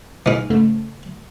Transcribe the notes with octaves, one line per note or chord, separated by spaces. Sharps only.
B2 E3 G#3 D#4 F6
G#2 C#3 A3